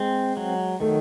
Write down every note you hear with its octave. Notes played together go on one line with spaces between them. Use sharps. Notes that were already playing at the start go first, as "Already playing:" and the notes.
Already playing: G#3 C4
F#3
D#3 A3